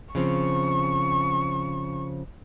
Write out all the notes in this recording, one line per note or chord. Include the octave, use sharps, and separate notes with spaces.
C#3 F3 C4 C#6